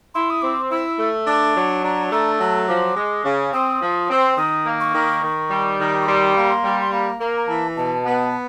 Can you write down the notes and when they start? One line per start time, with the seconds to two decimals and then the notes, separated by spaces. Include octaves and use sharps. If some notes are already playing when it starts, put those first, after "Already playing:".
0.14 E4 C6
0.30 D#6
0.42 C4 D6
0.71 E4 E6
0.99 A3
1.27 D4
1.56 F#3
1.84 D4 A#5
2.12 A3 A#5
2.40 F#3 A5
2.68 F3 D6
2.96 G#3
3.24 C#3
3.53 C4 D#6
3.81 F3
4.10 C4
4.37 D#3 D#6
4.66 A#3
4.80 C#6
4.94 D#3
5.22 D#3
5.50 G3
5.80 D#3
6.02 C#6
6.07 G3 C6
6.36 A#3 B5
6.49 C6
6.64 G3
6.81 C6
6.92 A#3 B5
7.20 A#3 A#5
7.37 A#5
7.48 E3 A5
7.77 B2 A5
8.05 B3